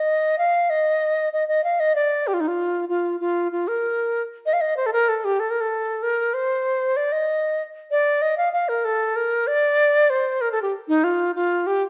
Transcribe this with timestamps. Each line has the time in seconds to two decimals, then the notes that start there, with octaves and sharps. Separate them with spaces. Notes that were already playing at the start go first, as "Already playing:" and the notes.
Already playing: D#5
0.38 F5
0.70 D#5
1.33 D#5
1.48 D#5
1.64 F5
1.80 D#5
1.95 D5
2.27 G4
2.34 F4
2.40 D#4
2.48 F4
2.89 F4
3.20 F4
3.52 F4
3.68 A#4
4.46 D#5
4.53 F5
4.61 D#5
4.77 C5
4.86 A4
4.93 A#4
5.09 A4
5.24 G4
5.40 A4
5.50 A#4
5.61 A4
6.03 A#4
6.34 C5
6.96 D5
7.12 D#5
7.91 D5
8.22 D#5
8.37 F5
8.53 F5
8.68 A#4
8.85 A4
9.16 A#4
9.47 D5
10.10 C5
10.41 A#4
10.52 A4
10.62 G4
10.88 D#4
11.04 F4
11.35 F4
11.67 G4